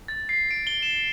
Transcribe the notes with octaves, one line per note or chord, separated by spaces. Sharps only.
A6
C7
D7
G7
E7